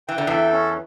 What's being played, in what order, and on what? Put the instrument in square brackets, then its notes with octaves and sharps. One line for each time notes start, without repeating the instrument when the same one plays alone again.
[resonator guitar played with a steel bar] E3 [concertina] G5
[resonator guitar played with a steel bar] D3
[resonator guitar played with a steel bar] E2 E3 [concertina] A4
[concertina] C#4